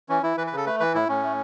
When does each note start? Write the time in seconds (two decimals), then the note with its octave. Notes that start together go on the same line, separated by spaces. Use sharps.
0.09 E3 C#4
0.23 E3 E4
0.37 E3 B4
0.47 B4
0.52 C#3 A4
0.66 A3 B4
0.80 E3 B4
0.94 A2 E4
1.09 A2 C#4
1.23 A3